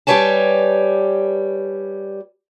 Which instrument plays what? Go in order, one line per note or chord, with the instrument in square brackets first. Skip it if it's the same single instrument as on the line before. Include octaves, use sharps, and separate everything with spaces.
[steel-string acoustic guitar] G3 G4 B4 C#5 G#5 A5